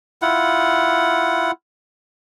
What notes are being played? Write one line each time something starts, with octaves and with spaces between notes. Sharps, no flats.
E4 F4 F#5